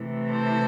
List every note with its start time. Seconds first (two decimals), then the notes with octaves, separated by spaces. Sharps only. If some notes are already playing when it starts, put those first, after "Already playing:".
Already playing: C3 E3 A3
0.32 A4 C5